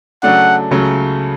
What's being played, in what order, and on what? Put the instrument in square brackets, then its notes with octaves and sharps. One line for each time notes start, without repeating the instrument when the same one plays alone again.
[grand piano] C#3 F#3 A3 D4 [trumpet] F#5
[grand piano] C#2 C#3 F#3 A3